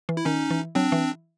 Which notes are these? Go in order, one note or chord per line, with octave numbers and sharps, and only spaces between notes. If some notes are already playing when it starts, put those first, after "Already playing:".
E3
E4
D#3 C#4 D#4
E3
F#3 C4 D4
E3